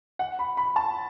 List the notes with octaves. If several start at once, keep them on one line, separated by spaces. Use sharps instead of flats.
F#5
B5
B5
A5